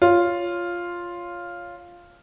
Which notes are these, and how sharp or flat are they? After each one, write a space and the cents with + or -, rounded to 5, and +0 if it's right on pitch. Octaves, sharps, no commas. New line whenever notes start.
F4 +0 C#5 +10